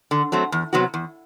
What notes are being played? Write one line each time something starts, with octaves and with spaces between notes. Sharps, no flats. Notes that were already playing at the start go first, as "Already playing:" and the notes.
D3
F#3 A3 C4
E2
C3 F#3 B3 F#4
E2